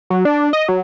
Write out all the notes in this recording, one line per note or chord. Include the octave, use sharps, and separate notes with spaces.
F#3
D4
D#5
F#3